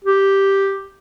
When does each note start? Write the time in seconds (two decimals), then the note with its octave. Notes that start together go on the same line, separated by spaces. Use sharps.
0.05 G4